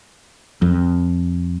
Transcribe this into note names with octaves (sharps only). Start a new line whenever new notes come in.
F2